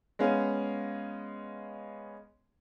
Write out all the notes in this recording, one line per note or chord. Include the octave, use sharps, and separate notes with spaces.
G#3 B3 C#4 F5